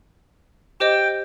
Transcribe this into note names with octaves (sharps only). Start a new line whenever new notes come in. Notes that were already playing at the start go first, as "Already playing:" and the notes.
G4 C5 D#5 G5